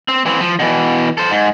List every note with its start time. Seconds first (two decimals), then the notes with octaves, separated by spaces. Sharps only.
0.08 C4
0.26 E3 C4
0.40 F3
0.59 B2 E3
1.17 A4 C5
1.31 G#2